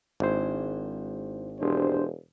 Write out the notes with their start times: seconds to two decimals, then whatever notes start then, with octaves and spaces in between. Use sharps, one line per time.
0.20 G#1 D4 E4 C5
1.60 E1 D4 G4 C5